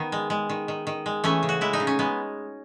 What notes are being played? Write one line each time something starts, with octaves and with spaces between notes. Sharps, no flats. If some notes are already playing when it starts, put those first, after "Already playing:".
Already playing: D#3 B3 D#4
G#3
G#3
D#3
D#3
D#3
G#3
E3 A3 C#4
C#3
F#4
G#3 E4
D#4
C#3
C#4
G#3 B3